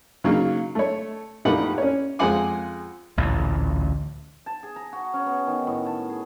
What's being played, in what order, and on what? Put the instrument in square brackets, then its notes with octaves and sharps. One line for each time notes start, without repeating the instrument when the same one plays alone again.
[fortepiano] C#3 F#3 A#3 D#4
A3 C#5
A#1 A3 D#4 G4 B4 F#5
C#4 C#5
F2 F3 G#3 F#5 G#5 D6
[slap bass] A1 D2 A#2 E3
[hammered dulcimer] A5
G#4
A#5
F#4
C#4
B3
D#3
A2
A5
G#4